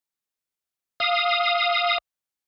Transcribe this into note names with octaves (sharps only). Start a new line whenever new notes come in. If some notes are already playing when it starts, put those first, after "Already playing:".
F5 D#6